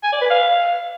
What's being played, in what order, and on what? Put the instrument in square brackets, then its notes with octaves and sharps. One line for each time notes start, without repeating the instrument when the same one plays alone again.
[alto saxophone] G#5
D5
B4
F5